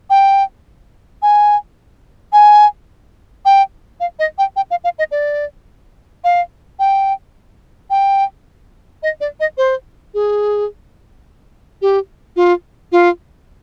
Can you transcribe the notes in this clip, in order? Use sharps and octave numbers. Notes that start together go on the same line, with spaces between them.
G5
G#5
G#5
G5
F5
D#5
G5
G5
F5
F5
D#5
D5
F5
G5
G5
D#5
D5
D#5
C5
G#4
G4
F4
F4